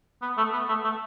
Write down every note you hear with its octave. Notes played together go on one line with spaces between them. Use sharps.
B3
A3
B3
A3
A3